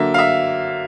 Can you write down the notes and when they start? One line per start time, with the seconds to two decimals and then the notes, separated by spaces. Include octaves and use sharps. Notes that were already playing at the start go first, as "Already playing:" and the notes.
Already playing: D3 F#3 A#3 E5
0.14 F5
0.18 E5